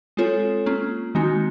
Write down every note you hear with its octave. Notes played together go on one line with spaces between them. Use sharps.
G#3 C4 F4 A4 C#5
A#3 C#4 F4
D#3 G#3 C4 D#4 F#4